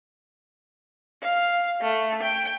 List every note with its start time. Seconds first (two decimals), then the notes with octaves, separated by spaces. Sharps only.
1.22 F5
1.81 A3
2.22 G5